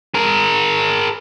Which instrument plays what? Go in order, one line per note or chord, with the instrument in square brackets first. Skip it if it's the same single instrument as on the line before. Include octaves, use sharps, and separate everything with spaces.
[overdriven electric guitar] G#4 A#4